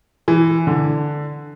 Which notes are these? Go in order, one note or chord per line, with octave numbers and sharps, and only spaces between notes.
E3
D3